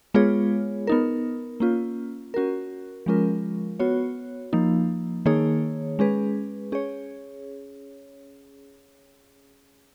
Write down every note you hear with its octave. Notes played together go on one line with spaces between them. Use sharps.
G#3 B3 F4 G#4 C#5
B3 D#4 A#4
A#3 C#4 F4
C#4 F#4 A#4
F3 G#3 C#4 F4 A#4
B3 F#4 C#5
F3 A#3 D#4
D#3 A#3 D#4 G#4 C#5
G#3 C#4 G#4 B4
C#4 G#4 C#5